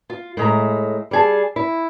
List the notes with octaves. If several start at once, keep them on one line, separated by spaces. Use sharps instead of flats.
F4
A2 G#3 E5 A#5
G3 G#4 A5
E4